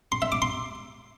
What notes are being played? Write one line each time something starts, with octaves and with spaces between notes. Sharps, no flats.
C6
E5
D6
C6